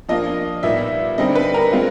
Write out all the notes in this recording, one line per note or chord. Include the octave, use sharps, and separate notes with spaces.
F3 A#3 D4 F4 D#5
A#2 G3 B3 D#4 E5
D3 G3 C4 D#4 D#5
B4
A#4
G#3 C4 F4